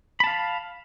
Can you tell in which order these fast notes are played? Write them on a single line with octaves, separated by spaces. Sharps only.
B5 A5 F5